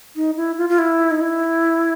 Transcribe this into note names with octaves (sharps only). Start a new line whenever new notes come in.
D#4
E4
F4
F4
E4
D#4
E4